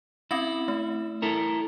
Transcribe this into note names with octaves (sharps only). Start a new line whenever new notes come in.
C4 C#4 E4 A#6
A3
E4 A4 A#4